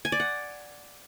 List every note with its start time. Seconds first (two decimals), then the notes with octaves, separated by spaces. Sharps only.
0.05 G#5
0.12 D5
0.20 F#5